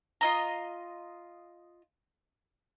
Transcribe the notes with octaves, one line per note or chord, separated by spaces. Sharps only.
F4 D#5 A#5